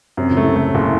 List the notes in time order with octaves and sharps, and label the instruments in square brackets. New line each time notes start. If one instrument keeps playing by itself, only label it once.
[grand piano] F#2 [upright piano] C3 C4
[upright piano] C#2 C#3
[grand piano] A3
[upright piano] C2 C3
[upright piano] A2 [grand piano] A3
[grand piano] F#1